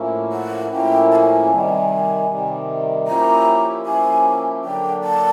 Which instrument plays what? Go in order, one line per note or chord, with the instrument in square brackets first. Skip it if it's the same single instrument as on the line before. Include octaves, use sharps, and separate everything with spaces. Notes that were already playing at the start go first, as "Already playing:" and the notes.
Already playing: [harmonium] A2 F3 A#3 C#4 E4
[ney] F#5
[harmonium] A2 F3 A#3 C#4 E4 [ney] G5
[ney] A5
G#5
[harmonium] C3 D#3 G3
C3 D#3 G3
[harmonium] F3 A#3 C#4 E4 G4 [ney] A#5
[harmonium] F3 A#3 C#4 E4 G4 [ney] G#5
[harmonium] D3 F#3 A#3 D4 [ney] G5
[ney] A5